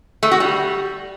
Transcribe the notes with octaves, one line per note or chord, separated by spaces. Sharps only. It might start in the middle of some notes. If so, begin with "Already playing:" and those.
A3
F#4
G3